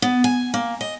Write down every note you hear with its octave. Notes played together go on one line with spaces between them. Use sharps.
B3
G#5
A#3
D#5